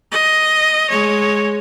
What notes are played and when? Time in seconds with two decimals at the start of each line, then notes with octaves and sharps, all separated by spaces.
0.12 D#5
0.90 G#3 C#5